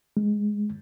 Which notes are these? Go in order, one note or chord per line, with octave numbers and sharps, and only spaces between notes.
G#3